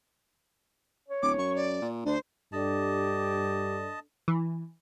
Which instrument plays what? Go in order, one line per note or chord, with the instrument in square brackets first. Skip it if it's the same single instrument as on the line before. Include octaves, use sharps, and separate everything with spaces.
[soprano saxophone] C#5
[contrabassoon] D1 [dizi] D6
[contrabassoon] F#2 [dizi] C#6
[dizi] D5
[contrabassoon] A#2
[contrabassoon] D2 [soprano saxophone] D4 [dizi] C5
[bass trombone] G2 [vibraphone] D4 A4 D5 [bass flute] G4 [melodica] D#5 A5
[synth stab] E3